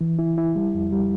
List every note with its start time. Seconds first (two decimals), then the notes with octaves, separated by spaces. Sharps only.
0.01 E3
0.19 E4
0.38 E4
0.56 G3
0.75 F2
0.92 G3